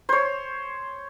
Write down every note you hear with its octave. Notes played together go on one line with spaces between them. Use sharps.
C5 C#5